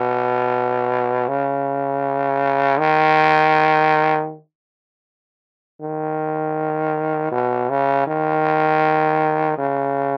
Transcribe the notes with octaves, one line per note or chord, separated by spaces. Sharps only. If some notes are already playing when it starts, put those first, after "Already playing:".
Already playing: B2
C#3
D#3
D#3
B2
C#3
D#3
C#3